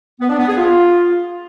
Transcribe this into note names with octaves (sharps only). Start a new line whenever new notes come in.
B3
D4
B3
G#4
F4